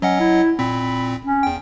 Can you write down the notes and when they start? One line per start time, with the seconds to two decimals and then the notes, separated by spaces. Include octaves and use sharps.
0.02 F#3 C#4 D#5 F#5
0.20 E4
0.59 A#2 C4 B5
1.24 C#4
1.43 E2 G5